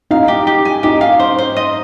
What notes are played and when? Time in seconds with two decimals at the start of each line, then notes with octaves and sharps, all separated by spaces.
0.11 D#4 F5
0.28 G4
0.47 G4
0.65 G#5
0.83 D#4 G4
1.01 F5
1.20 C5
1.38 C5
1.56 D#5